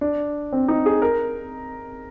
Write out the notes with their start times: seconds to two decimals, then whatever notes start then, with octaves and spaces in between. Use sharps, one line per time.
0.01 D4
0.53 C4
0.69 D#4
0.86 G#4
1.02 A#4